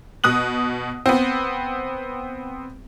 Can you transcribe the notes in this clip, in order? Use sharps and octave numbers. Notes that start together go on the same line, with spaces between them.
B2 D#6 F#6 F#7
B3 C4